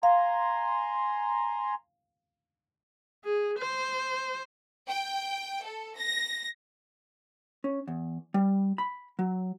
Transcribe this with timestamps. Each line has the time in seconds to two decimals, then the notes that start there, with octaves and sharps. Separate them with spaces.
0.03 F5 G#5 A#5 C6
3.25 G#4
3.58 C5
4.88 G5
5.64 A4
5.96 A#6
7.64 C#4
7.88 E2
8.34 G3
8.78 B5
9.19 F#3